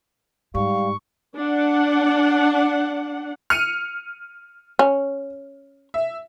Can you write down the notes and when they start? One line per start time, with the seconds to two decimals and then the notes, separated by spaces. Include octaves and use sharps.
0.55 G#2 G3 F5 C#6
1.37 D4 F#5
3.50 F6 C#7 D#7
4.79 C#4
5.94 E5